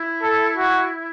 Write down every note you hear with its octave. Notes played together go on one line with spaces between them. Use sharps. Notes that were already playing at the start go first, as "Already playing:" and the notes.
Already playing: E4
A4
F#4